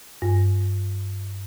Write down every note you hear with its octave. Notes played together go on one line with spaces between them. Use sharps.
G2